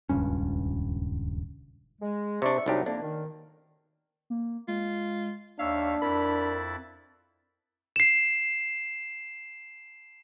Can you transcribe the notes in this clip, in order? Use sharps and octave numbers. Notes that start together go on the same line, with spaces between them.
D#1 C#2 G2 C#4
G#3
C3 D4 D5 E5 C#6
C2 F#3 D4 D#4 G4
F2 A#3 D4
D#3
A#3
G#3 F4
D#2 D4 C#5 E5 F5 E6
F2 E4 A#4 B5 A6
C7 E7